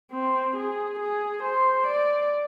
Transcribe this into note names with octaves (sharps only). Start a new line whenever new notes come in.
C4
G#4
G#4
C5
D5